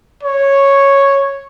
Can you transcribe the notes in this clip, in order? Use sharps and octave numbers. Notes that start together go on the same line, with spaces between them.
C#5